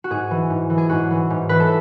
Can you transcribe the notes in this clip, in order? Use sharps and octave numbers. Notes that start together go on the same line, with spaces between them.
F#4
G#2 G#4
E3
G#2
E3
G#4
G#2 F#4
E3
G#2
E3 B4
A4